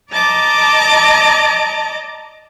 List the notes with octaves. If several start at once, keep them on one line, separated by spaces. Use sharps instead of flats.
D5 D#5 A5 A#5 D6